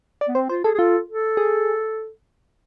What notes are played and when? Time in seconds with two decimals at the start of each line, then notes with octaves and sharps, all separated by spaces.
0.21 D5
0.28 B3
0.35 C4 C5
0.49 F4 C5
0.64 G#4 A4
0.75 G#4
0.79 F4 A4
1.08 A4
1.37 G#4